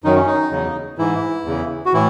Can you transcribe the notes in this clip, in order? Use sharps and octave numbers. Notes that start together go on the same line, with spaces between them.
F#2 D#3 F#3 D#4
C#4
D#4
E2 C#3 F#3
G#2 E3 E4
E2 C#3 E3
F#4
A2 E3 E4